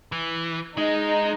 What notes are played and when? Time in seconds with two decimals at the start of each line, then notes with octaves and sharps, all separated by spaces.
0.12 E3
0.78 G#3 D#4